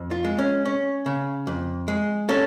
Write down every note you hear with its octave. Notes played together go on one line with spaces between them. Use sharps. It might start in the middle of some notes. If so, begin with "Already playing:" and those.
Already playing: F2
F4
G#3
C#4
C#4
C#3
F2
G#3
C#4 A4